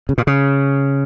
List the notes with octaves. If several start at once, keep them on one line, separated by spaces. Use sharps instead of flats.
C#3
A#2
C#3